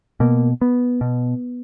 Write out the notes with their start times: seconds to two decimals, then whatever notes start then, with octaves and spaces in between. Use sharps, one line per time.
0.20 B2 A#3
0.61 B3
1.01 B2